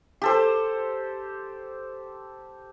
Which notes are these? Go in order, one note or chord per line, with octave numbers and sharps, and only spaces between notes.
G4 A4 C5